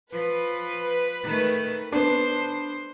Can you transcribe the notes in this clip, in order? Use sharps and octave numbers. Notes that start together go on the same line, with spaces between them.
F3 B4
D#3 A3
B3 D4 C5